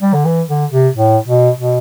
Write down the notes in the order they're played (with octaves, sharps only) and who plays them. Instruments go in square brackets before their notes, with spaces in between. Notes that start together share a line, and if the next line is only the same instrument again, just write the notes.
[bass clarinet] G3
D3
E3
D3
C3
A2
B2
B2